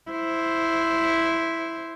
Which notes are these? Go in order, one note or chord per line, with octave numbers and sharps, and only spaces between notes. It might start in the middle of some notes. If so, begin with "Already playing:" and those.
E4 C5